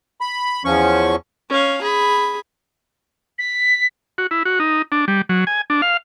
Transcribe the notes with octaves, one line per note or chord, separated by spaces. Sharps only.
B5
E2 F3 C#4 C#6
C#4 F5
G#4 B5
B6
F#4
E4
F#4
D#4
D4
G3
F#3
G#5
D4
F5